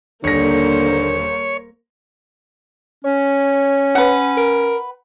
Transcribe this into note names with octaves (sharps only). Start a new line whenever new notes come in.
D#1 D3 A#3 C5 C#5 A#6
C#4 C#5
B4 F#5
A#4